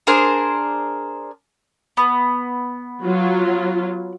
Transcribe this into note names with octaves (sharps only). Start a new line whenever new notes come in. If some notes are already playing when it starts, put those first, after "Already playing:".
D4 G#4 A#4 C5
B3
F#3 F4